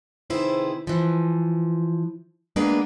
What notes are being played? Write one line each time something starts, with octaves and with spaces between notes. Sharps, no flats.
C3 D#3 E4 G#4 B4 C5
E3 F3
G#3 A#3 B3 D4 B4